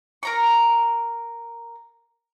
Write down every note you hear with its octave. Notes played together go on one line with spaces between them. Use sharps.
A#4 A#5 C#6